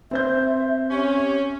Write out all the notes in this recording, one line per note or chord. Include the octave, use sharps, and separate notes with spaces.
C4 C5 E5 G6
C#4 G4